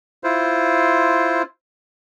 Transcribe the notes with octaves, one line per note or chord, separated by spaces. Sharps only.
E4 F4 C5